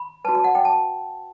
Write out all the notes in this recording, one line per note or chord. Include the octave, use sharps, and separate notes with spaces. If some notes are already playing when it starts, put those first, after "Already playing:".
Already playing: B5
F#4 B4 A5
A5
F#5
G5
A5